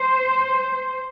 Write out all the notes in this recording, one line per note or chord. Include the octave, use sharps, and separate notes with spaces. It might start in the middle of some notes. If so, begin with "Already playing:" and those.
Already playing: C5